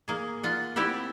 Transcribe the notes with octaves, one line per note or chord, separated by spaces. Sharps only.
A#3 G#4
F4 F#5
C4 E4 G4 E5 F#5